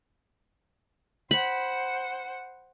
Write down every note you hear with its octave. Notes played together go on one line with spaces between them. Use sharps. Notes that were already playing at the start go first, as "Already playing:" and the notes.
C5 F#5 B5